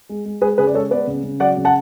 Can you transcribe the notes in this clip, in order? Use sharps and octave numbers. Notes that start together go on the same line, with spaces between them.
G#3
G#3
G#3 G#4 B4
C#3 G#4 B4
D5
G#3 A4 C#5
B3 B4 D5
C#3
C#3
F#3 D5 F#5
C#3
F#5 A5